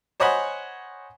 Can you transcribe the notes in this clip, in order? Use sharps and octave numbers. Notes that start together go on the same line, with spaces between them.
C5 C#5 D#5 F#5 G#5 B5